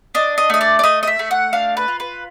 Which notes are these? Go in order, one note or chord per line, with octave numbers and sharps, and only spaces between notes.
D4 D#5
D#5
A3 D#5
D5
D5
A3 D#5
D#5
E5
A3
F#5
D4 F5
B4
F4
B4